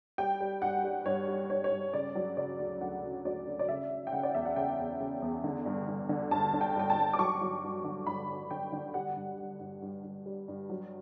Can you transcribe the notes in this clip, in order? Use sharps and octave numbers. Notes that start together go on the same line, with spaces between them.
G3 G5
G3
G2 F#5
G3
G2 C#5
G3
G2 C#5
C#5
G2
C#3 D5
F#3
C#3 D5
D2
D2 F#5
C#3
D2 D5
D2
D5
C#3 E5
C#3
G5
C#3 F#5
D5
E2 E5
F#5
C#3 G5
E2
C#3
E2
D3
G2
G2
D3
G2 A5
D3
G5
G2 G5
A5
G2
D6
F#3 C#6
F#3
G2
D3
G2 B5
G2
D3 G5
D3
G3 F#5
G2
G3
G2
G2
G2
G3
G2
F#3